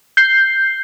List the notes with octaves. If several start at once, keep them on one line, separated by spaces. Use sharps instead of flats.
G6 C7